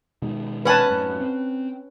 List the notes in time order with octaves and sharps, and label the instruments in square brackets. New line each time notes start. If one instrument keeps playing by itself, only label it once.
[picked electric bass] B2 D#3 G#3
[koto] C#4 F#5 [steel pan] B4 G#5 A5
[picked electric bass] F#2 A2
C4